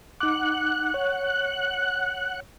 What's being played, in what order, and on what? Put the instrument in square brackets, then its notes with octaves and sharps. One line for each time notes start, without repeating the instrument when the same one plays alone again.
[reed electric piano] D#4 D6 [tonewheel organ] F#5 F#6
[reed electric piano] C#5